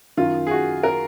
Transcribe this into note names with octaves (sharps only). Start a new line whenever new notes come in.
F#2 D#3 F4
G#4
F#4
A#4